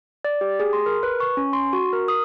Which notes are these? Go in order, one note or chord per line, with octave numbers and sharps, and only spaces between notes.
D5
G4
G#4
C6
A#4
B4
C#6
C#4
C6
F#4
A#4
D#6